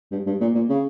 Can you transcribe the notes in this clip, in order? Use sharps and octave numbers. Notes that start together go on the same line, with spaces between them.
G2
G2
A#2
A#2
C#3